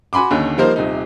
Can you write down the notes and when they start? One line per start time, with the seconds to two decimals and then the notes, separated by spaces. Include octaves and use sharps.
0.13 F#4 G#5 B5 C6 D6
0.31 D#2 D3 D#3 C#4
0.58 F3 G3 A#3 D#4 A#4 C5
0.76 D#1 C3 D#4